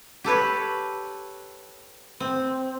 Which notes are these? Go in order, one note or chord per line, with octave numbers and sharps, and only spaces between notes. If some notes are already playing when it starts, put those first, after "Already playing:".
G4 A4 B4 C#5
C4